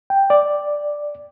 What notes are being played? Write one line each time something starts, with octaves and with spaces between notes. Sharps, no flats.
G5
D5